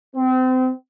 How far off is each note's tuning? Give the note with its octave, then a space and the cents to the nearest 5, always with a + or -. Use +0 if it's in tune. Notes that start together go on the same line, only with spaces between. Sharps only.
C4 -30